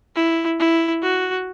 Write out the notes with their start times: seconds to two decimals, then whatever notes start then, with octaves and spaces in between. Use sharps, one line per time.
0.16 E4
0.59 E4
1.02 F#4